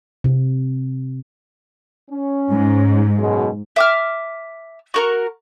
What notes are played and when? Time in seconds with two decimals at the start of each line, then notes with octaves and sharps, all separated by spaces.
0.24 C3
2.10 C#4
2.52 G#2
3.19 F#2 B2 G#3
3.76 E5 D6 F6
4.94 F#4 A#4 C#6